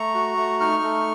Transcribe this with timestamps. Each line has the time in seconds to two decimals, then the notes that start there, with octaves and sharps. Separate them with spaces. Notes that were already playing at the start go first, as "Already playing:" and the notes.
Already playing: A3 A#5 C#6
0.15 F#4
0.37 A3
0.60 D#4 C#6 F6
0.83 A3